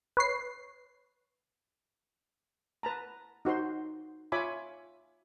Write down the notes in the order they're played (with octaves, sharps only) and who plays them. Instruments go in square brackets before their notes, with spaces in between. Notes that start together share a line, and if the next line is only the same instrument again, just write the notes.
[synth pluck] B4 C#5 C7
[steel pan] B4 A5 A#5
D#4 F#4 C5 C6
F4 C#5 E5 G#5 B5 D6